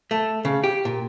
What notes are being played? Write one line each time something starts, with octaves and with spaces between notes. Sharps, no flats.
A3
C#3
G4
A#2